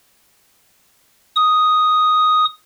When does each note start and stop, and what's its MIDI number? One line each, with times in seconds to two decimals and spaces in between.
1.36 2.45 87